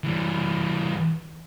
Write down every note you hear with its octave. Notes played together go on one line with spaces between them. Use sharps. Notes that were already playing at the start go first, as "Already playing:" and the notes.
E3 G3